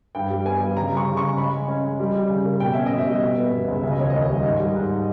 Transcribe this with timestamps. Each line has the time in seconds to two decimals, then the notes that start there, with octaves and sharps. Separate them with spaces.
0.15 G2 G5
0.30 G3
0.45 B3 G#5
0.61 G3
0.76 C#3 A#5
0.91 G3
0.97 C#6
1.07 C#3
1.17 C#6
1.23 C#3
1.38 G#3 B5
1.53 G#3
1.68 C#4
1.84 G#3
2.00 G3
2.14 G3
2.30 C#3
2.45 A#3
2.60 B2 G5
2.73 C#4 E5
2.86 D#5
2.91 B2
2.98 E5
3.07 G3
3.22 B2
3.38 B3
3.52 B2
3.68 C#2
3.83 C#3 E5
3.92 D#5
3.98 D#2 C#5
4.10 D#2 D#5
4.30 G3
4.44 G#2
4.60 G3
4.75 G#2